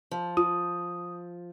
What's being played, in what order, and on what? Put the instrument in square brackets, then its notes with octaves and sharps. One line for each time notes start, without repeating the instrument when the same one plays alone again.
[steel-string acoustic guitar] F3
[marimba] F4 [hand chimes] D#6